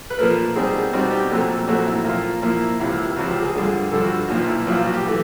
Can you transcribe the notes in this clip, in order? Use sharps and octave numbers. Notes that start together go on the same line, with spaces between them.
B4
A#2 F3 A3 A#4
B2 G3 C4 D#4 G#4
B2 G3 C4 D#4 F#4
G4
A#1 A#2 F#3 A3 C4 A4
A#1 A#2 F#3 A3 C4 F#4
E4
A#2 F3 A#3 F4
A#2 F3 A#3 E4
C#2 C3 F3 E4
C#2 C3 F3 F#4
G4
G#4
G2 D3 F3
G2 D3 F3 A4
F#4
B1 A#2 F3 D#4
E4
B1 A#2 F3 F#4
F4
F#4
G4
E3 A3